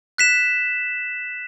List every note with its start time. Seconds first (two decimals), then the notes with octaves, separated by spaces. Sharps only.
0.18 F#6 B6 E7